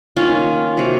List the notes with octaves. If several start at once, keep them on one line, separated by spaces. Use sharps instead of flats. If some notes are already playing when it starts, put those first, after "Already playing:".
D#3 A#3 C#4 F4
C3 F#3 A#3